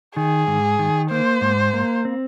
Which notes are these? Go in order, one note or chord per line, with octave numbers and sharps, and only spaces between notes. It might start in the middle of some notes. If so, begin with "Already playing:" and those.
D#3 G#4
G#2
D#3
A#3 C5
G#2
A#3
C4